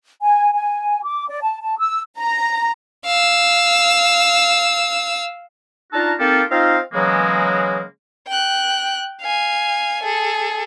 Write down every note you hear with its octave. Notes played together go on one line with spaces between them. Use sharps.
G#5
G#5
D6
D5
A5
A5
E6
A#5
F5 E6
D4 D#4 F4 F#4 A5 A#5
A#3 C4 D#4 F4 G4 A4
C4 D#4 F4 D#5 F5
C#3 E3 F#3 G#3 A#3 B3
G5 F#6
F5 G#5
G#4 A4